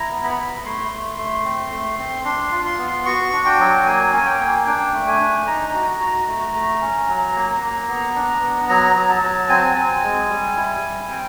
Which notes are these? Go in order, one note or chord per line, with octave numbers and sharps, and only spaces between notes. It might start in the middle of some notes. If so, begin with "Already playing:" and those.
Already playing: E4 A#5
B3
B5
E4
A3 C6
A3
A3
C4
A3
C4
D4 C6
F4
C6
B3
F#4 C#6
D4
G5
F#3
A#3 G#5
C#4 G#5
G5
A#3
D4 G5
A3
G#5
D4
D#4 A#5
F#4
F#4
A3
A3
C#4
F#3
A#3
A#3
B3
D4
B3
F#3 A#5
F#3
A5
F#3
C4 G#5
A5
G#5
C4
G#3
G3
E4
G3
C4 G5